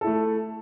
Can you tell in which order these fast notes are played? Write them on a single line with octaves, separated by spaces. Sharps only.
A4 E4 A3